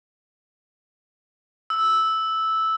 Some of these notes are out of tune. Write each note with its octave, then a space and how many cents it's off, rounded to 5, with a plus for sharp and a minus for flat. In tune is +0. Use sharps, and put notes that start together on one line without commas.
E6 -10